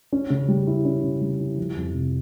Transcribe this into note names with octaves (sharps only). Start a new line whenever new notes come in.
C#4
C#3
G3
E4
C#4
C#3
G3
E4
F3
F2
C3